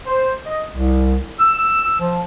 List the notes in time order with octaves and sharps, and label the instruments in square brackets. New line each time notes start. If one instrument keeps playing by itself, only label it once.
[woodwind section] C5
D#5
C2
E6
F3